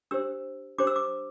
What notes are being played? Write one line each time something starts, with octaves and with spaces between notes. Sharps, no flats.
D4 G4 C5 E6
D4 G4 C5 D6
E6
D6